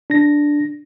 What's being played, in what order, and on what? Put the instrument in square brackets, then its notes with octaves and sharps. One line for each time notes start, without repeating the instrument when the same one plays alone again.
[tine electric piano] D4 A#6